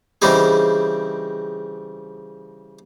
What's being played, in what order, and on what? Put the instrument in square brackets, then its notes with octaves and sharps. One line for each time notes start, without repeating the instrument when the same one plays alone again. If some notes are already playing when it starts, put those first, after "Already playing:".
[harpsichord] C#3 E3 G3 C4 D#4 G#4